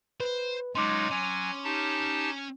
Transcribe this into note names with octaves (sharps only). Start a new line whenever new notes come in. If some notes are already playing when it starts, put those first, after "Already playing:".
B4 C5
F#3 G#3 C#4 D#4 F4 C6 D6
F#3 C#4 G#5
D#4 G4 A5